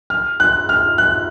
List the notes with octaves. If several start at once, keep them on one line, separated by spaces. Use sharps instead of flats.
F6
F#6
F6
F#6